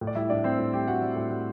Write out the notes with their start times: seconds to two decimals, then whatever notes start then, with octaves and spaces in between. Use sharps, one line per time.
0.01 A2
0.07 D5
0.15 G3 E4 E5
0.30 A2 D4 D5
0.44 G3 C4 C5
0.59 A2
0.73 G3 G4 G5
0.87 A2 F#4 F#5
1.02 G3
1.16 A2
1.31 G3